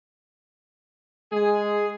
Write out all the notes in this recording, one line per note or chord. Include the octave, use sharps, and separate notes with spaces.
G#3 G#4